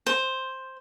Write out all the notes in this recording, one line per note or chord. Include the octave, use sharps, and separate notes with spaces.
C5